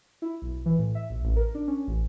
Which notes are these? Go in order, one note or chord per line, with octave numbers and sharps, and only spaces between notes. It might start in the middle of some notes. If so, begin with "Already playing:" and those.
E4
B1
E3
A2
E5
A#1
A1
A#4
D4
C#4
A1